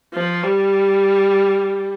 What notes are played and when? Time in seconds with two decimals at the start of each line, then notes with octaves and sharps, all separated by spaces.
0.14 F3
0.43 G3